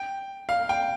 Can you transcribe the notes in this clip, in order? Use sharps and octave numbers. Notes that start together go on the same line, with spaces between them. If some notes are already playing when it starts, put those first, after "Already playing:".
Already playing: G5
F5
G5